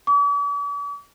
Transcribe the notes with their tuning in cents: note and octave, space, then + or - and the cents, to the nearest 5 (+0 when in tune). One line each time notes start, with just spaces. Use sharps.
D6 -45